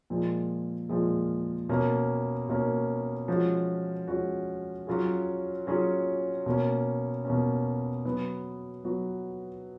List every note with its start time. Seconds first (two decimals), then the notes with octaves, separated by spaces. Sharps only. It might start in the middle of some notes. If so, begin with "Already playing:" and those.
0.10 A#2 F3 G#3
0.89 A#2 F3 G#3
1.69 B2 A#3 C#4
2.49 B2 A#3 C#4
3.28 F3 G#3 C#4 F#4
4.07 F3 G#3 C#4 F#4
4.87 F#3 C#4 F4 G#4
5.67 F#3 C#4 F4 G#4
6.46 B2 A#3 C#4
7.25 B2 A#3 C#4
8.05 F#3 B3 F#4
8.84 F#3 B3 F#4